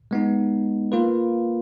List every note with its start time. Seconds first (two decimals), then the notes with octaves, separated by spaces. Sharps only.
0.11 G#3 B3 D#4
0.92 A#3 F4 B4